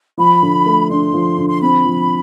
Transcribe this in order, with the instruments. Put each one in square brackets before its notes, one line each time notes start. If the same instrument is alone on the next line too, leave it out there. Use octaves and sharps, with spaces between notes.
[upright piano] F3 [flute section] B5
[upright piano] D3
A3
[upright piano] D4 [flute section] C6
[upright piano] F3
D3
[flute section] C6
[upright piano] C4 [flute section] B5
[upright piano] F3